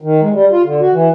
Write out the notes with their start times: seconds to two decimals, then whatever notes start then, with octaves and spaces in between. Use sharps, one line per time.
0.01 D#3
0.21 G#3
0.33 G3
0.52 F4
0.64 D3
0.81 F#4
0.93 E3